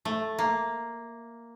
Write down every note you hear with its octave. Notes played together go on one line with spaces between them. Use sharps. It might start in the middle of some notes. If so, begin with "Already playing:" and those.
A3
A#3